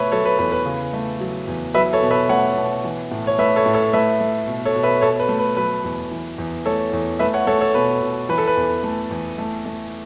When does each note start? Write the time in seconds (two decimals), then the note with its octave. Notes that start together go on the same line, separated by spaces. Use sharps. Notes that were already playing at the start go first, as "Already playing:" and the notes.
Already playing: B2 A3 B4 C#5 E5
0.12 F#3 A4 C#5
0.25 B4
0.39 E2 B4
0.52 B4
0.65 C#3
0.94 A3
1.20 F#3
1.48 E2
1.74 F#3 B4 E5
1.93 A4 C#5
2.02 B2
2.11 B4 E5
2.29 A3 C#5 F#5
2.56 B2
2.84 E3
3.11 A2
3.27 C#5
3.38 A3 B4 E5
3.56 A4 C#5
3.66 A2
3.74 A4 C#5
3.93 A3 B4 E5
4.20 A3
4.47 B2
4.65 A4 C#5
4.75 B2
4.83 B4 E5
5.01 B2 A4 C#5
5.20 B4
5.29 A3
5.39 B4
5.57 F#3 B4
5.84 E2
6.11 E3
6.38 E2
6.65 A3 A4 C#5
6.93 E2
7.19 A3 B4 E5
7.33 C#5 F#5
7.47 A3 A4 C#5
7.61 A4 C#5
7.75 B2 B4
8.01 B2
8.29 E3 B4
8.38 A4
8.47 B4
8.57 E2
8.83 A3
9.11 E2
9.38 A3
9.65 A3